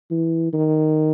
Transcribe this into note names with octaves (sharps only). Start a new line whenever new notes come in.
E3
D#3